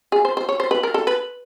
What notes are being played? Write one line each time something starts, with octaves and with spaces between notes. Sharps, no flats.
G#4
C5
C5
C#5
C5
B4
A#4
A4
B4